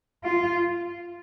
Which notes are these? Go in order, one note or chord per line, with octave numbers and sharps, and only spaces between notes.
F4